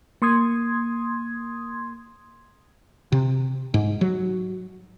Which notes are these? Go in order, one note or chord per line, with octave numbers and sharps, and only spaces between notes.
A#3 C6 D#6 G#6
C3
G#2
F#3